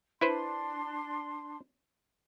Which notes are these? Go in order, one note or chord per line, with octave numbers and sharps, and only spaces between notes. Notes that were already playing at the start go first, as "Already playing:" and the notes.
D4 E4 B4 C5 C6